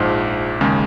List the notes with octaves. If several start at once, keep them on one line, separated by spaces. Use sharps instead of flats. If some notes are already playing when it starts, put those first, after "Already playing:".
Already playing: A#1 G#2 F3
D#2 C#3 G#3